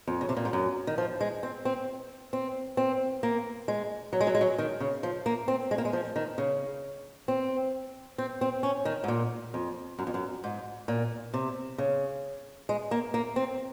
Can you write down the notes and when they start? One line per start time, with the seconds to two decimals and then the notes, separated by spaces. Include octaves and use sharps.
0.07 F2
0.21 C#3
0.29 C3
0.37 A#2
0.45 G#2
0.53 F#2
0.87 D#3
0.98 F3
1.21 G#3
1.43 C4
1.65 C4
2.33 C4
2.77 C4
3.23 A#3
3.68 G#3
4.13 F#3
4.21 G#3
4.27 F#3
4.35 G#3
4.41 F#3
4.58 D#3
4.80 C#3
5.03 F3
5.26 A#3
5.48 C4
5.71 G#3
5.78 A#3
5.85 G#3
5.93 F3
6.16 D#3
6.38 C#3
7.28 C4
8.18 C4
8.41 C4
8.63 C#4
8.85 D#3
9.04 G#2
9.08 A#2
9.54 F2
9.99 F#2
10.07 F2
10.14 F#2
10.44 G#2
10.88 A#2
11.34 C3
11.78 C#3
12.69 G#3
12.91 A#3
13.14 A#3
13.36 C4